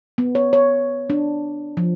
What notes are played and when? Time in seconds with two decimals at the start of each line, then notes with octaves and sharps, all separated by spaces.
0.18 B3
0.35 C#5
0.53 C#5
1.10 D4
1.77 F3